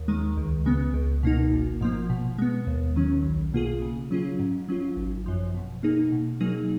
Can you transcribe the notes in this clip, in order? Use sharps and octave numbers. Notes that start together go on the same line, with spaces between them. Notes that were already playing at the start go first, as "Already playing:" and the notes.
Already playing: D#2
D#3 G#3
C#2
C#3 G#3 B3
C#2
B2 A#3 D#4
G#1
G#2 F3 A#3
B2
G#3 B3
D#2
D#3 F#3 C#4
B1
B2 A#3 F4 G#4
C#3
F#3 C#4 F4 G#4
G#2
F#3 C#4 F4
G#1
F#2 F3
B2
A#3 D#4 G#4
B2
F#3 A#3 D#4 G#4